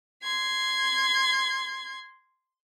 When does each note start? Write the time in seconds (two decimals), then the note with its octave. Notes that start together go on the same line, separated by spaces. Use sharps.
0.23 C6 G#6